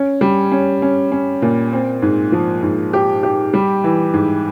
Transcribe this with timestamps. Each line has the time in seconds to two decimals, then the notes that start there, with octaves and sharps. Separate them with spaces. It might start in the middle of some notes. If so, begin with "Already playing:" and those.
Already playing: C#4
0.21 G3
0.52 C#4
0.82 C#4
1.12 C#4
1.42 A#2
1.72 C4
2.02 G#2
2.32 F3
2.63 G#2
2.93 G4
3.23 G4
3.54 G3
3.84 E3
4.13 G#2